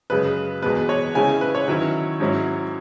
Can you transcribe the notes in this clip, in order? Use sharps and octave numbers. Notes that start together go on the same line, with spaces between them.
F#2 C#3 G#3 B4
E2 B2 G#3 B3 B4
C#5
C#3 G#3 C#4 E4 G#5
B4
C#5
D#3 F#3 C#4 E4
G#2 F#3 C#4 E4